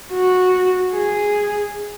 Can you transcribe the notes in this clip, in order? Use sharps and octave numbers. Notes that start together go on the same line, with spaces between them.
F#4
G#4